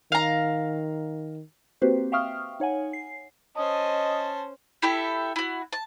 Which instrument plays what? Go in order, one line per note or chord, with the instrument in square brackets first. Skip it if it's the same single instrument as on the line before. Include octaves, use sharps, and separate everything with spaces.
[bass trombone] D#3 [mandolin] F5 A#5
[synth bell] A#3 C4 F#4 G4 B4 C5
E5 F5 G5 C#6 D#6 F6
D#4 C#5 F#5 G#5
C7
[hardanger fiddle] C#4 C5 [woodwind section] D#5 [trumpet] A5
[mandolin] E4 G4 A4 E5
E4 F#4
A5